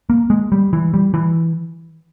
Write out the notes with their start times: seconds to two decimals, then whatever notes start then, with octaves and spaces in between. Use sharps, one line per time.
0.10 A#3
0.30 G#3
0.52 G3
0.73 E3
0.94 G3
1.14 E3